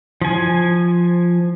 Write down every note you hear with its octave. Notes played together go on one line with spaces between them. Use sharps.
F3 G#5